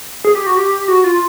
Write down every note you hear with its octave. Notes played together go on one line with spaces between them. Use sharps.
G#4
G4
F#4
G4
F#4
F4